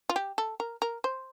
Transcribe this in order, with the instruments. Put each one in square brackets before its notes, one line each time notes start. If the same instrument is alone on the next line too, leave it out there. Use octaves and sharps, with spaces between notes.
[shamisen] F4
G4
A4
A#4
A#4
C5